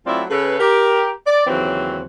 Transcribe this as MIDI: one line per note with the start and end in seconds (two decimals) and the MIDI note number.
0.07 0.23 54
0.07 0.23 57
0.07 0.23 60
0.07 0.23 64
0.07 0.23 65
0.07 0.23 74
0.30 0.57 49
0.30 0.57 69
0.30 0.57 71
0.59 1.12 67
0.59 1.12 70
1.27 1.47 74
1.47 2.03 39
1.47 2.03 49
1.47 2.03 52
1.47 2.03 54
1.47 2.03 60